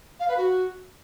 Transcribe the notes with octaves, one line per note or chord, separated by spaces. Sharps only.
F5
B4
F#4